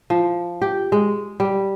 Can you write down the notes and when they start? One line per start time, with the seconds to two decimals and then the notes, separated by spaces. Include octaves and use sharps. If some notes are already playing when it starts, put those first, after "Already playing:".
0.10 F3
0.62 G4
0.92 G#3
1.40 G3